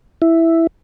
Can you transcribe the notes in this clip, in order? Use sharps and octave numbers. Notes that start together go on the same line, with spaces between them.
E4